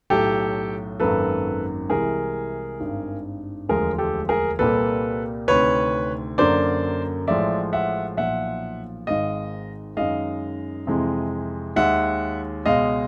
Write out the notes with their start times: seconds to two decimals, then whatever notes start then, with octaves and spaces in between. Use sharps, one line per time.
0.10 B1 A2 F#3 G4 A4
1.00 G#1 F#2 D#3 F#3 A#3 A4 B4
1.90 C2 C3 E3 G#3 G#4 A#4
2.80 G#1 G2 D#3
3.69 E1 D2 D3 F3 G#3 G#4 A#4
3.98 G4 A4
4.29 G#4 A#4
4.59 C2 A#2 G3 A#3 A4 B4
5.48 D2 C3 D#3 B4 C#5
6.38 F#2 D3 F#3 A#3 C5 D5
7.28 A1 A2 F3 G#3 D5 E5
7.73 E5 F#5
8.17 B1 A#2 F3 E5 F#5
9.07 G#1 G#2 D#3 G#3 D#5 F5
9.97 F#2 D#3 G#3 D#5 F5
10.87 F2 C3 E3 G#3
11.76 D#2 D#3 G#3 E5 F#5
12.66 C#2 B2 G#3 D#5 F5